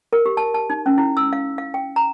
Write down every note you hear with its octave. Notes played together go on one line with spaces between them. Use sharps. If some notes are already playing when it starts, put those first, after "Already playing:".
A#4
G4
A5
A5
D#4
C#4
E4
E6
F5
F5
G5
A#5